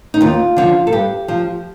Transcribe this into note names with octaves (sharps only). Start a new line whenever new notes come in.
D#4
D#2 F4
D3 F3
A4
G2 G4
F3